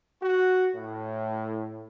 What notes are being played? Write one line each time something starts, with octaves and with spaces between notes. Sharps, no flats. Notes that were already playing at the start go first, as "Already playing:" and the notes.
F#4
A2